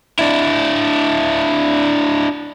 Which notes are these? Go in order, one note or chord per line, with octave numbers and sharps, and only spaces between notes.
D4 E4